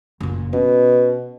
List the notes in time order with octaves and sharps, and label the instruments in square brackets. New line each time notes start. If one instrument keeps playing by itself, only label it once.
[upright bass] F#1 A#2
[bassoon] B2 [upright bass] C#4